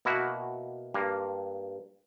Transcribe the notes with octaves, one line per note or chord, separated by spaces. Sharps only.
B2 A#3 E4 F#4
G2 A#3